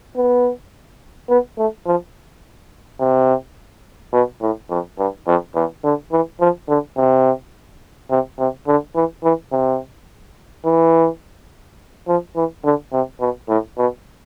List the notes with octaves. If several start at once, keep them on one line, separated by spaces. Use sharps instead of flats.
B3
B3
A3
F3
C3
B2
A2
F2
G2
F2
E2
D3
E3
F3
D3
C3
C3
C3
D3
E3
E3
C3
E3
F3
E3
D3
C3
B2
A2
B2